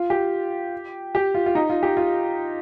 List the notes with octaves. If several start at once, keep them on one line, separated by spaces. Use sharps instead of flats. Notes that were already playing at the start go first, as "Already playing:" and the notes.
Already playing: F4
G4
G4
F4
F4
D#4
F4
G4
F4